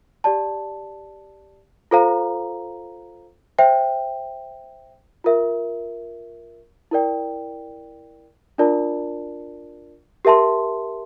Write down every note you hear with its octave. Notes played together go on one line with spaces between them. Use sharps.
G4 D5 A5
F4 A4 C5 F5 A#5
C5 E5 G5
F4 A#4 E5
E4 A#4 D5 G5
D4 F4 A#4 D5 A5
G4 A#4 E5 A5 C6